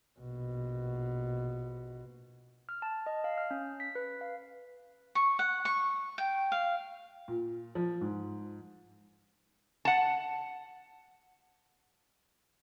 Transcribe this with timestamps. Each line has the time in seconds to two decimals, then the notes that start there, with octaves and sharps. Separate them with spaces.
0.20 A#1 B2
2.69 F6
2.82 A5
3.06 D#5
3.24 F5
3.38 F6
3.51 C#4
3.80 B6
3.95 B4
4.21 F5
5.15 C#6
5.39 F#5
5.65 C#6
6.18 G5
6.52 F5
7.28 A#2
7.75 F3
8.01 G#2
9.85 F#5 A5